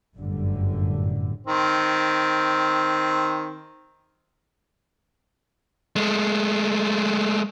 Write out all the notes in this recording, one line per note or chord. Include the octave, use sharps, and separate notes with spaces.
G1 F#2 A2 D3 G3
D#3 C4
G#3 A3